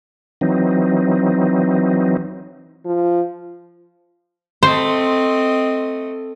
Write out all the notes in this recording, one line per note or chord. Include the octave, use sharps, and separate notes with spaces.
E3 F#3 C4 D#4
F3
A3 C4 C5 D#5